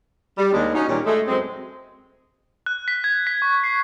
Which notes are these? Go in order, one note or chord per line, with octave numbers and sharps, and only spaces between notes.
G3
D#2 G#3 D4
C#4 D#4 F#4
A#2 D#3 F#3 G3 C#4 G4
G#3 A3
F#2 G#3 C4
F#6
B6
G#6
B6
C#6
C7